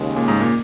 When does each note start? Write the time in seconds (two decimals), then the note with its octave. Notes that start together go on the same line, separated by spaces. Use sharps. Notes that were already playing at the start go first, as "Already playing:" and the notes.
Already playing: D#2 C#3 G#3
0.16 A#2
0.28 G#2
0.41 A#2